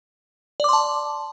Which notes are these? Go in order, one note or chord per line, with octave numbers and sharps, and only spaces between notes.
D5 A5 C6 D6